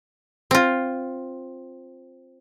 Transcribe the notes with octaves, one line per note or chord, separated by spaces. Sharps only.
C4 F4